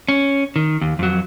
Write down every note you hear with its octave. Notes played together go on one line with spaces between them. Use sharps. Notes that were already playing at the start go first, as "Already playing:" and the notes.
C#4
D#3
D#2
F2 F#3